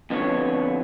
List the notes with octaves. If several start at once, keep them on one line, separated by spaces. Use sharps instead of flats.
F2 D3 B3 F4 F#4 C#5